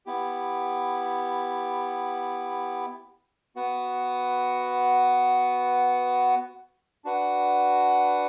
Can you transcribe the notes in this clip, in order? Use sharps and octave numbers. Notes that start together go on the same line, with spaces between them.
B3 E4 G4
B3 F#4 B4 F#5
D4 F#4 B4 F#5